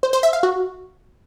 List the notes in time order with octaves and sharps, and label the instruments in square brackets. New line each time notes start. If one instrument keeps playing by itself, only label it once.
[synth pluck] C5
C5
E5
F5
F#4